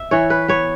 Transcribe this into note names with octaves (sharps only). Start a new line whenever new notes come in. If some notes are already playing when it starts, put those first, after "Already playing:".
Already playing: E5
E3 C#5
B4
B3 C#5